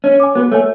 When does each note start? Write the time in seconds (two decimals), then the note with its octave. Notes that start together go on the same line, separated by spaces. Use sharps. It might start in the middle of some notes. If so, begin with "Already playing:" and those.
0.04 C#4 C#5
0.20 G#5 D6
0.35 B3 F#4
0.51 A3 C#5
0.54 G#5